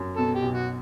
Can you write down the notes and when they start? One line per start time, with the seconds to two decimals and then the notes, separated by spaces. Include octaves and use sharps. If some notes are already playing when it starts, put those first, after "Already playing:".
Already playing: F#2
0.17 B2 A4
0.35 G4
0.42 B1
0.54 F#4